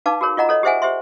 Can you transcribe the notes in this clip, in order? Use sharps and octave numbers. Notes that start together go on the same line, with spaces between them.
D#4 B4 F5 A5 D6
F#4 G#4 A#4 C#5
F4 D#5 F#5 A#5
A4 C#5 D#5
G4 G#4 C5 E5 F#5 G#5
G4 C5 E5 C6